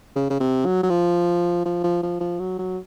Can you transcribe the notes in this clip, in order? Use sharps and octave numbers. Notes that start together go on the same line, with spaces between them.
C#3
C#3
C3
F#3
F#3
F3
F3
F3
F3
F3
F#3
F#3